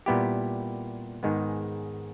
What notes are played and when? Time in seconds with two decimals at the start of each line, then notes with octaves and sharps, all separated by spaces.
0.06 A#2 G3 B3 E4 G4
1.23 G#2 D#3 G#3 B3